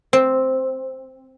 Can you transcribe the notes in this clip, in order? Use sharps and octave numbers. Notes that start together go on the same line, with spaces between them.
C4